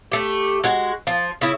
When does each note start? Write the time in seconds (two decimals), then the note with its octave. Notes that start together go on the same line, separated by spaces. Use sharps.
0.12 A3 G4
0.64 G#3 F#4
1.07 F3
1.41 C#3 E4